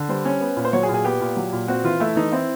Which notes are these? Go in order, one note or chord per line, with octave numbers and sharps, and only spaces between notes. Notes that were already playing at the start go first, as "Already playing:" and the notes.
Already playing: D3
G3 C5
C#4
B3
A#2
C5
F#3 C#5
G#4
A#2
G#4
B3 G4
A#2
F#3
A#2
C4 F#4
E3 F4
A3 E4
E3 D#4
C4 E4